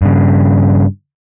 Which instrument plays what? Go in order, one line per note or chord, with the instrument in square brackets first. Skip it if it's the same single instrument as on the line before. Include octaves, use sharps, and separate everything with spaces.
[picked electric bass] G2 C#3